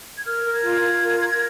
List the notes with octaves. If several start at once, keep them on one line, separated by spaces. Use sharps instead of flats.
G#6
A#4 F6
A#4
G#6
F4
F4
A#4
A#4